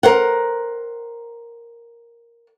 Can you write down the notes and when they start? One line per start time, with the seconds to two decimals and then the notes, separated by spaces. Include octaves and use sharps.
0.03 A#4 C5 F#5